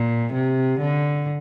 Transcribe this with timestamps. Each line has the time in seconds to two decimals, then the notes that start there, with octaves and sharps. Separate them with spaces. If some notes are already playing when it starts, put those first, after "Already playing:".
Already playing: A#2
0.34 C3
0.80 D3